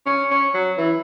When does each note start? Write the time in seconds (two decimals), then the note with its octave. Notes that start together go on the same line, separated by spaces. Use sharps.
0.06 C#4
0.31 C#4
0.54 F#3
0.77 E3